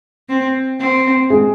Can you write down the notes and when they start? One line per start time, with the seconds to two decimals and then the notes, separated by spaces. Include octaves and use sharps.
0.29 C4
0.79 C4
1.30 G#3 G#4